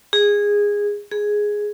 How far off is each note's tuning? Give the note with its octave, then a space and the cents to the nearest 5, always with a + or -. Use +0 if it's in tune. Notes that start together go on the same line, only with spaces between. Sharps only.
G#4 -15
G#4 +0